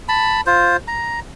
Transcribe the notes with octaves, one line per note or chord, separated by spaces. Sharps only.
A5 B5
F4 C5
A#5